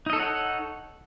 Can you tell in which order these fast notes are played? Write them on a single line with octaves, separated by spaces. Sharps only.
D#4 D#5 A4 C#5 F#5